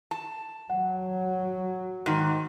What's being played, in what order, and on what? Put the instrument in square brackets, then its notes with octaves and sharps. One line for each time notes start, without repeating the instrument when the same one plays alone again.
[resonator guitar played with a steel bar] A5
[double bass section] F#3 [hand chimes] F#5
[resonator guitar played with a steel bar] G#2 D#3